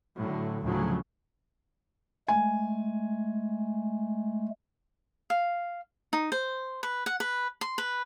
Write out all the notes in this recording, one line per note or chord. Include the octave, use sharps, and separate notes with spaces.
A2 D3 F#3
D2 A2 C#3 F3 F#3
G#3 A3 G#5
F5
D#4
C5
B4
F#5
B4
C6
B4